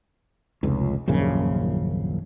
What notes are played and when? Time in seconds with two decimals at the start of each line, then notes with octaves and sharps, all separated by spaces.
0.63 F1 C#2
1.07 D#1 A#1 F#2 C#3